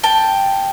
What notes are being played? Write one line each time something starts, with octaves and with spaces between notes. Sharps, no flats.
G5 A5